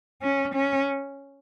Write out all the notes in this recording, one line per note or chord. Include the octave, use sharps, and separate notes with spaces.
C#4
C#4